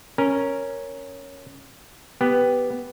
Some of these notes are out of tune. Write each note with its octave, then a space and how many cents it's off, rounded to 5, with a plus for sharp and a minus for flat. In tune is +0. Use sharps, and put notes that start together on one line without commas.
C#4 +0 A#4 +0
B3 +0 G4 +0